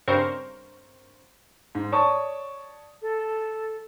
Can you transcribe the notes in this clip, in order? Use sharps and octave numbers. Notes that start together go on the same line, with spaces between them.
G2 C#3 C4 A#4 C5 C#6
G#2
C#5 D5 A5 C#6 D#6
A4